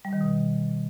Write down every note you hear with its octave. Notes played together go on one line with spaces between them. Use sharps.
G3
D#3
B2